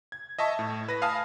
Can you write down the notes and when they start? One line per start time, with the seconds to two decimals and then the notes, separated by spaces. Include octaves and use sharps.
0.12 G#6
0.39 D#5 E5 A5 C#6
0.59 A2
0.88 B4 A#6
1.02 F5 G#5 A5 B5 D#6 F6